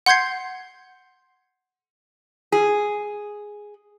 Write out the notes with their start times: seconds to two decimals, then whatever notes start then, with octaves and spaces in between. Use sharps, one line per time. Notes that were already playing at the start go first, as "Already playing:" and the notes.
0.06 F#5 C6 G6 G#6 C7
2.52 G#4